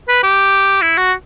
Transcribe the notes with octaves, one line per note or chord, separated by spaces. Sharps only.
B4
G4
E4
F#4